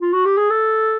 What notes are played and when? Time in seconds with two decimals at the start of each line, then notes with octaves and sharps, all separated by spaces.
0.01 F4
0.13 F#4
0.25 G4
0.37 G#4
0.50 A4